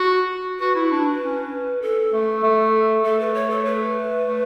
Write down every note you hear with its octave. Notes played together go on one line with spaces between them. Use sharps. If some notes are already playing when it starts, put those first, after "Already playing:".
Already playing: F#4
F#4 B4
E4
D4
C#4
A4
A3
A3
A3 A4
B4
C#5
A4
B4
A3